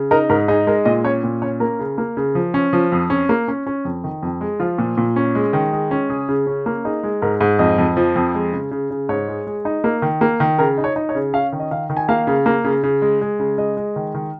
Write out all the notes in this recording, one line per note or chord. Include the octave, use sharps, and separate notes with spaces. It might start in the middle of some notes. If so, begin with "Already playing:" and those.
Already playing: C#3
D#4 A#4
G#2 A#4
D#4 G#4
G#3 A#4
A#2 D#5
C#4 C#5
A#2
C#4 C#5
A#3 A#4
C#3
A#3
C#3
F3
C#4
F3
F2
C#4
A#3
C#4
C#4
F2
D#3
F2
G#3
F3 F4
A#2
A#2
C#4
G#3
D#3
G#3
C#4
C#3 G#4
C#3
C#4
A#3
D#4 G#4
G#3
G#2 A#4
G#2
F2 D#5
F2
F3
F2
G#3
C#3
C#3
C#3
G#2 C#5
G#3
G#3
D#4
A#3
D#3
A#3
D#3
C#3 A#4
D#4
C#5
D#4
C#5
C#3
C#4 F5
D#3
D#5
D#3 F5
D#3
G#5
A#3 F5
C#3
A#3
C#3
C#3
G#3
G#3
C#3
G#3 D#5
G#3
D#3
D#3